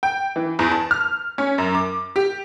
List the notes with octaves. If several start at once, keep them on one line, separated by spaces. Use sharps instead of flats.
G5
E3
E2
A5
F6
C#4
F#2
D6
G4